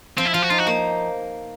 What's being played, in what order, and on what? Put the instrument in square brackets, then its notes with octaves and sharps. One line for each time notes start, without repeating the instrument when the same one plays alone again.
[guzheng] F3 [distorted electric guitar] C4
[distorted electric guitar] E4
[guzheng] F3 [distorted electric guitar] F4
[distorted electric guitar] F#4
[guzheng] D#4 [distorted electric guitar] F4
[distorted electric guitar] F#4
[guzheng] A#3